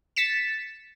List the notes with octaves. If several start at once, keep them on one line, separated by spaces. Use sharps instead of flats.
A6 B6 C#7 E7